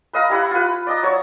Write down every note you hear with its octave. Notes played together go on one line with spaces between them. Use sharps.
B4 D#5 F5 A#5
G3 E4 F#5
F4 B4
D5 D#5 A#5
F#3 C#5 C#6 E6